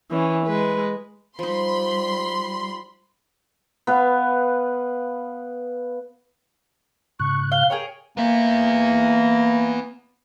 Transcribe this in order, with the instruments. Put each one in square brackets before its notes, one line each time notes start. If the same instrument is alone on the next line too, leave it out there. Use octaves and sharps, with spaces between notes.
[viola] E3 C#4
G#3 B4
[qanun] F3 D#4 [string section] G3 B5 C6
[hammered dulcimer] B3 B4 F5
[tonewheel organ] G#2 C#3 F#6 [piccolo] C#6
[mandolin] F5 [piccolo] G7
[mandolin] G#4 A#4 C#5 [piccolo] G5
[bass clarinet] A#3 [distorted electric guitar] B3 E5